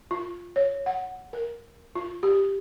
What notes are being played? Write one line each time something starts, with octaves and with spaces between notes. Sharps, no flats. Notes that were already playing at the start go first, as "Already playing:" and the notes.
F4
C#5
F#5
A#4
F4
G4